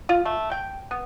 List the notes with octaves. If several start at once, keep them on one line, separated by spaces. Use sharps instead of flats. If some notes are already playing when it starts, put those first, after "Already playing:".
F4
A3
G5
B3